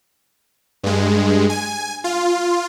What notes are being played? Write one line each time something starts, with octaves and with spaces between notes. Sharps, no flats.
G2 G#3
G#5
F4